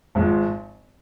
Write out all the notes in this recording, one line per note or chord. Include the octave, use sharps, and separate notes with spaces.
G#1 G#2 F3